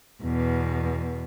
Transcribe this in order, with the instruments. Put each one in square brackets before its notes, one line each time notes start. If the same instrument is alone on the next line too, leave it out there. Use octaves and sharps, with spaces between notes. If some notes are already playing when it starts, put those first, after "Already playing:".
[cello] E2 B2